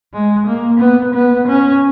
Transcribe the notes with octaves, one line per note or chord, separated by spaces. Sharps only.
G#3
A#3
B3
B3
C#4